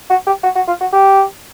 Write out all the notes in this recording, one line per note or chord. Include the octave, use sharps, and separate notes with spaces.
F#4
G4
F#4
F#4
F4
F#4
G4